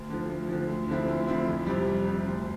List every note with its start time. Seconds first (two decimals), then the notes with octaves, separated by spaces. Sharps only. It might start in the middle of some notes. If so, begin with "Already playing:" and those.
Already playing: D2
0.10 D3 F3
0.29 D2
0.49 D3 F3
0.69 D2
0.88 D3 F3 C4 E4
1.08 D2
1.27 D3 F3 C4 E4
1.48 F2
1.66 C3 G3
1.87 F2
2.05 C3 G3
2.26 D2